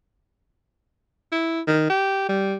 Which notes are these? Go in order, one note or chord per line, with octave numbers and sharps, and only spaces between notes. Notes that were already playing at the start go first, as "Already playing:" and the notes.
E4
D#3
G4
G3